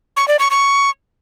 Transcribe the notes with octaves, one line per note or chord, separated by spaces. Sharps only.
C#6
D5
C#6
C#6